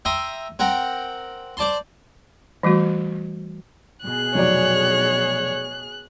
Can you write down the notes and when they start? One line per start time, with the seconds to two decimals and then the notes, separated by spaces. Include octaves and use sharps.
0.05 E5 G5 A#5 C6 D#6
0.59 C4 A#4 F#5 G5
1.57 C5 D5 A5 C6
2.63 E3 G3 A3 F#4
4.03 B2 G#4 F#6
4.35 F1 F#3 C#5 D5